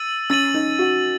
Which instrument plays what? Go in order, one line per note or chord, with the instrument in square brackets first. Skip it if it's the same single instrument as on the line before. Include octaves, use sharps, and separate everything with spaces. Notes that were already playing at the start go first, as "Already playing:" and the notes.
Already playing: [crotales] E6 A6 D#7 F#7
[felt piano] C#4 [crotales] E6 A6 D#7 F#7
[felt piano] D#4
F#4